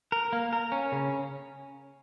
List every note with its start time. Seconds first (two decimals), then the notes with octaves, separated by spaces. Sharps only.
0.12 A#4
0.33 A#3
0.53 A#4
0.72 C#4
0.92 C#3